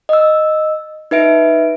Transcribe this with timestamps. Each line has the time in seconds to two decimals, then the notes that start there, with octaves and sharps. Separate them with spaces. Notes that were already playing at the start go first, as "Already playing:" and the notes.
0.09 D#5 E6
1.11 D#4 B4 E5 D7